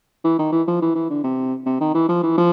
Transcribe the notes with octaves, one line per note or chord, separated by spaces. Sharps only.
E3
D#3
E3
F3
E3
E3
D3
C3
C3
D#3
E3
F3
E3
F3